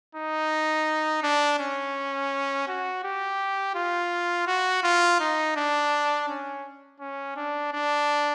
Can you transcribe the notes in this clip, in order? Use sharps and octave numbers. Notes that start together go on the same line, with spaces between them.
D#4
D4
C#4
F#4
G4
F4
F#4
F4
D#4
D4
C#4
C#4
D4
D4